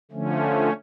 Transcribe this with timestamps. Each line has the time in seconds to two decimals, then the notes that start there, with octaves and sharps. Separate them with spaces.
0.11 D3 F3 A3 C#4